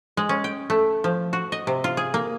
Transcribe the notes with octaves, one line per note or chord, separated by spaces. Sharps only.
G#3
C#4
G5
A3
F3
F#4
D#5
C3
F4
G#4
A#3